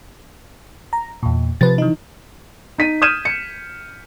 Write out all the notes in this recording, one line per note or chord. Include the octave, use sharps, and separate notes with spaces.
A#5
E2 A#2
C3 F3 B4 A6
E3 D#4
D#4 B6 D#7
D#6 F6 G6 G#6 D#7 E7
C#7